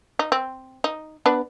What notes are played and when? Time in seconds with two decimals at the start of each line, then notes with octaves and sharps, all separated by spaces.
0.19 D#4
0.32 C4
0.84 D#4
1.26 B3 D4 B4